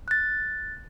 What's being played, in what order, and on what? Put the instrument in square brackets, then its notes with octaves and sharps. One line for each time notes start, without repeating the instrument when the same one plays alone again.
[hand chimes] F#6 A6